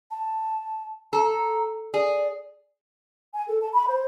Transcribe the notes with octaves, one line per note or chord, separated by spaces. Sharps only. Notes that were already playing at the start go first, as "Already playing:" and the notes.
A5
A4 A#5
G#4 D5
G#5
A4
A5
B5
C5